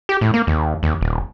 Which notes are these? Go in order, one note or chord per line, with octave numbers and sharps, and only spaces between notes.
G4
A2
A#3
D#2
D#2
D#1